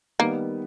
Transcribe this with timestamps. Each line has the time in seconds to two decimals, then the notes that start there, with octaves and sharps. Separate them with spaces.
0.19 D#3 G3 A#3 B3